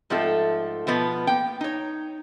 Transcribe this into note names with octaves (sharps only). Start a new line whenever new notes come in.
G#2 F3 A3 C4 A4
B2 F3 B3
A#3 G5
D#4 C#5